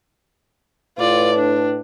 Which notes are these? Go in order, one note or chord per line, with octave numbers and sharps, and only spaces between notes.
A2 F4 B4 D5
D4